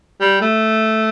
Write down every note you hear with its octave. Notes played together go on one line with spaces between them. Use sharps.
G3
A3